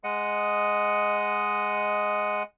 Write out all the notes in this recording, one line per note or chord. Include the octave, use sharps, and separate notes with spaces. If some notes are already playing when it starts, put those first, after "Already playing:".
G#3 D#5 F#5